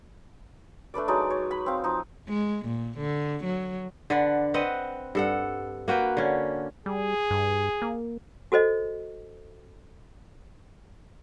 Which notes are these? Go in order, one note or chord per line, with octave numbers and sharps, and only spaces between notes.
A3 D4 B4 D5
F#3 G#3 D#4 D5
C#5
B5
C4 F5
F3 D#4
G#3
A#2
D3
F#3
D3 D4 B4 F#5
C4 B4 D#5 F#5
G2 A4 F#5
A#3 F#4 B4 G5
D3 C#4
G3 G#4
G2
A#3
F#4 A4 C5 D#5